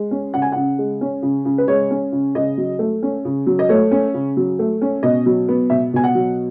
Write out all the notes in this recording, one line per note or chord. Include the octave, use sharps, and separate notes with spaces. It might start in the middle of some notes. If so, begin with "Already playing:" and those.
Already playing: G#3
C#4
C#3 F#5
G#5
C#3 F#5
G#3
C#4
C#3
C#3
B4
G#3 C#5
C#4
C#3
C#3 D#5
F#3
A3
C#4
C#3
F#3
D#5
A3 C#5
C#4
C#3
F#3
A3
C#4
B2 D#5
F#3
B3
B2 E5
B2 G#5
F#5
F#3